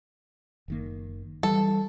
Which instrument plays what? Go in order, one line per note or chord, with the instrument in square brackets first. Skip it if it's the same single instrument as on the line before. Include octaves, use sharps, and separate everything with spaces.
[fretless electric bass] F#1 D#3 A#3
[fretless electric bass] E3 [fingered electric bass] G3 [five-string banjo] A4